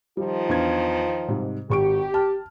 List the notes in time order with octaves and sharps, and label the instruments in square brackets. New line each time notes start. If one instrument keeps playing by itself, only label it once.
[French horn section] D#3 F3 F4 [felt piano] G3
[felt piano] E2 D4 G#6
G#2 C3 G3
[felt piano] G#1 C#6 D7 [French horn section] G4
[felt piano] A5 F6